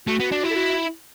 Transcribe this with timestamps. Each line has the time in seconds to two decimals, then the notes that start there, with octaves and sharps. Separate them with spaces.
0.07 A3 F#4
0.20 B3
0.32 D4
0.43 E4
0.50 A4
0.55 F#4